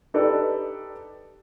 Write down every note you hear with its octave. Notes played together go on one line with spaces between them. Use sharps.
D#4 G4 A4 B4 D5